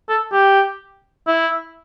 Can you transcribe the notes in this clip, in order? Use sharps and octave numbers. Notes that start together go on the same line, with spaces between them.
A4
G4
E4